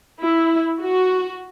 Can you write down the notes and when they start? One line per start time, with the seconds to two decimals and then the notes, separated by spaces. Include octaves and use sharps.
0.19 E4
0.81 F#4